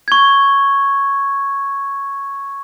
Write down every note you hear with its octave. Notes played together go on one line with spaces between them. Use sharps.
C#6 G#6